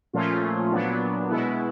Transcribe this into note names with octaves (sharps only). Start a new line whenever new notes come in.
A#2 F3 A3 C#4 F4
A#2 F#3 B3 D4
B2 G#3 B3 E4